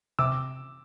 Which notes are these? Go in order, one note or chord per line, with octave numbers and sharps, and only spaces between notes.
C3 D6 E6